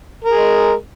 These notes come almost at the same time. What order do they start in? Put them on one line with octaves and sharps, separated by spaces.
A#4 G#4 G#3